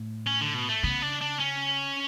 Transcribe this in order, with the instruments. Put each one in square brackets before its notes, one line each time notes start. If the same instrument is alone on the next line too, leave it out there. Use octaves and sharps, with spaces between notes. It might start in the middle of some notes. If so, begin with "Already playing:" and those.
Already playing: [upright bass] A2
[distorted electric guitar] C#4
D3
B2
A3
[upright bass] C#3 [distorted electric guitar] B3
[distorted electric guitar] D4
D4
C#4